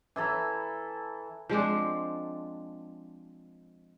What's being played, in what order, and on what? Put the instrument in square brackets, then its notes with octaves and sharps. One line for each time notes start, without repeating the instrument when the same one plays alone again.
[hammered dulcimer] E3 E4 A4 A#5
[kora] F3 G#3 C4 D4